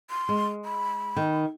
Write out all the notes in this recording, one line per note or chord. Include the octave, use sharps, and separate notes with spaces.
C6
G#3
B5
D#3